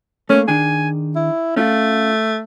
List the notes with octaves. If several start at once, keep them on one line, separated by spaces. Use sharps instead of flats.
A3 A#3 C#4
D#3 D4 G#4 G#5
E4
A3 C#4 F4